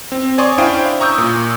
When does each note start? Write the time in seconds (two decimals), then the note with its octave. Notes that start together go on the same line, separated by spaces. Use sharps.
0.12 C4
0.38 C#5 D5 G#5 C6 C#6 D#6
0.58 C#4 D4 E4 C5 F5 G5
1.00 A#5 C#6 D#6 E6 G6
1.18 A#2